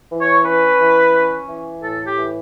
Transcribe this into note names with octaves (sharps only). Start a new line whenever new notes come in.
E3
C#5
C#4 B4
E3
C#4
E3
A2 A4
G4
E3